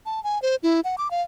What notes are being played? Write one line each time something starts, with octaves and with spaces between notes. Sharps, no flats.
A5
G#5
C5
E4
F#5
D6
F5